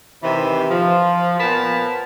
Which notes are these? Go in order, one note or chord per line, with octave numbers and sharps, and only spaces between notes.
C3 D#3 E3
F3
A#2 F3 B3 A#4 A5 B5